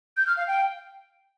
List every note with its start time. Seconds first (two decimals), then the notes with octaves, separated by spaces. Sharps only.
0.17 G6
0.27 F6
0.37 F5
0.47 G5